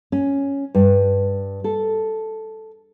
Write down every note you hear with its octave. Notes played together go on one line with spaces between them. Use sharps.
C#4
G2
A4